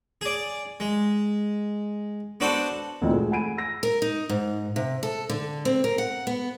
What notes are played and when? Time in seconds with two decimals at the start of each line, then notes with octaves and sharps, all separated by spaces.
0.21 G#4 D5
0.80 G#3
2.40 B3 D4 F#4 A4 C5
3.01 D2 A#2 E3 C4 D#4
3.13 G#3 A3
3.31 F#5 G#5 B5 D7 D#7
3.57 E6 A#6
3.83 A#4
4.02 D#4
4.29 G#2
4.76 C3
5.03 A4
5.29 D3
5.65 C4
5.84 A#4
5.98 F#5
6.27 B3